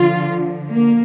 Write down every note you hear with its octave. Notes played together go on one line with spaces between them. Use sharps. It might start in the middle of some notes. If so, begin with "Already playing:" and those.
Already playing: D3 F3 F4
A#3